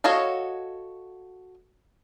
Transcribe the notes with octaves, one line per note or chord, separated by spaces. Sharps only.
F#4 A4 C#5 D#5 F5